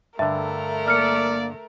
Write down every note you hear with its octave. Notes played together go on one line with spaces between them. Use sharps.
G2 D3 A3 A#4 E5
A#3 D5 F6 C#7